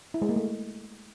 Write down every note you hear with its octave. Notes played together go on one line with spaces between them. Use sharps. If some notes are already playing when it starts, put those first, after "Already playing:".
E4
G#3
A#3
A3